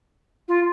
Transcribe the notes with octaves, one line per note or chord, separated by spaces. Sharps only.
F4